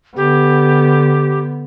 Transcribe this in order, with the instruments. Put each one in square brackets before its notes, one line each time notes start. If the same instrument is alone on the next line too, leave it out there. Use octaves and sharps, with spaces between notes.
[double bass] D3 B3 [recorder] G4